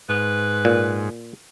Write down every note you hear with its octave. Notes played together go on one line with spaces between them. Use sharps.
G#2 B4
A#2